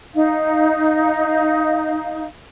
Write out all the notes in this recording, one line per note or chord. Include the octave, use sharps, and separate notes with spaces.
D#4 F5